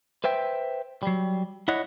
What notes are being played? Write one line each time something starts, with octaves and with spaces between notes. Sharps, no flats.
B4 C5 E5 G5
F#3 G3
E4 C#5 D#5 F#5